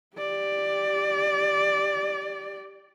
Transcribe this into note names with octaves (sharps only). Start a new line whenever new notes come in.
G4 D5